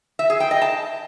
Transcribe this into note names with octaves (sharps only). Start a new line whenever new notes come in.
E5
G#4
G5
D#5
A5